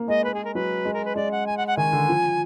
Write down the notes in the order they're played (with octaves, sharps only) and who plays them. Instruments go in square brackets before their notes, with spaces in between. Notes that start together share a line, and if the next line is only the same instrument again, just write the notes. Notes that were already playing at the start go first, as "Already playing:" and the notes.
Already playing: [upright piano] A#3
[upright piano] G#3 [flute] D#5
[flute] B4
G#4
A#4
[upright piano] F#3 [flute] B4
[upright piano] G#3
[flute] A#4
B4
[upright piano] G#3 [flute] D5
[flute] F#5
G#5
F#5
F#5
[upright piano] D#3 [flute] G#5
[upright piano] D3
F3